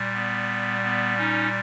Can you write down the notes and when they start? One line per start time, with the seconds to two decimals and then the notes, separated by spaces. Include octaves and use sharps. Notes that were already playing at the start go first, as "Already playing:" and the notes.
Already playing: A#2 G3
0.15 B3
0.83 B3
1.18 C#4 D#4